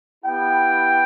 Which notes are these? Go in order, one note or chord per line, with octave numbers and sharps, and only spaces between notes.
B3 E4 G4 G5